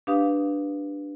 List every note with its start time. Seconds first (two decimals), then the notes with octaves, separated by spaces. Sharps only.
0.07 D4 G4 B4 F5 D#6